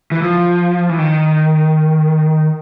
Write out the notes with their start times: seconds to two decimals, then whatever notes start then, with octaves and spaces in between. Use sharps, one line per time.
0.12 E3
0.22 F3
0.89 E3
0.99 D#3